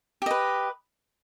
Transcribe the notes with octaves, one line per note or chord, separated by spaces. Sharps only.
G4 B4 D#5